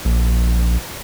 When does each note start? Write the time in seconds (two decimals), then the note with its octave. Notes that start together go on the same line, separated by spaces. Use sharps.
0.05 A#1